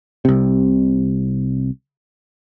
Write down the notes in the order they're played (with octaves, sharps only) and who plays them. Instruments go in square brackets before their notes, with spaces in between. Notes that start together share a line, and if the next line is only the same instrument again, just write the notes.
[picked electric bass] C2 C3